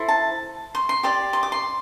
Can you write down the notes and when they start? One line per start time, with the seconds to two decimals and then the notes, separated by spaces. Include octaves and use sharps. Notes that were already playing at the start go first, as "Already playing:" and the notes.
Already playing: E4 A4 C5
0.08 A5
0.75 C6
0.89 C6
1.03 G4 D5 C6
1.33 C6
1.43 D6
1.52 C6